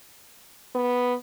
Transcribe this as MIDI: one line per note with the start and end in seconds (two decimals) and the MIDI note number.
0.75 1.15 59